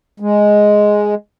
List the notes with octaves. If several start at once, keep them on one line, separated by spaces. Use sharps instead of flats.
G#3